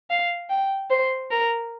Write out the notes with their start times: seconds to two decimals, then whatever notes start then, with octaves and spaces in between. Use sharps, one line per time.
0.10 F5
0.49 G5
0.90 C5
1.31 A#4